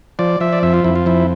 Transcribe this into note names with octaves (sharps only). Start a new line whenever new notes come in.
F3 D5
F3 E5
D5
F2 E5
F4
F2 E4
F4
F3 E4